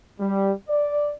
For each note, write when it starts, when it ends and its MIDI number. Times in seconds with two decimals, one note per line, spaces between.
0.20 0.51 55
0.68 1.10 74